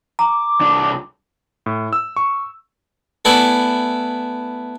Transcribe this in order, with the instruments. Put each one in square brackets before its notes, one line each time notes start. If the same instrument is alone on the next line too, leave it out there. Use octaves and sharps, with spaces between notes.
[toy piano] A#5 [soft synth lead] D6
[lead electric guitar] C2 D4
[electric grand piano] A2
E6
C#6
[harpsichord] A3 B3 E4 D5 E5 G#5